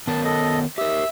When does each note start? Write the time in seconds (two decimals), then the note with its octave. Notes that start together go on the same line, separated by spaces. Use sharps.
0.07 D#3 B3 A#4 A5
0.24 A4 D#5
0.78 G4 A#4 E5